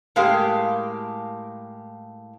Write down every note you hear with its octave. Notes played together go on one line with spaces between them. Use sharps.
A2 G#3 A#3 G4 G#4 F5